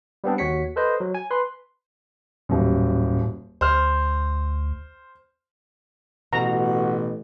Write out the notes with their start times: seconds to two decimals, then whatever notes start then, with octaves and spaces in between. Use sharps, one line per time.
0.24 G3 B3 C4 D4
0.38 D#2 F#4 C#5 B6 C#7
0.76 A4 B4 C5 D#5
1.00 F#3
1.15 G#5
1.31 B4 C6
2.49 D#1 F#2 A2
3.61 D2 C5 F6
6.33 A1 B2 A3 F#4 A#5